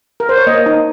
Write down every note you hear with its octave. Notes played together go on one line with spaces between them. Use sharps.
A#4
C5
C#5
A#3 D#5
D#4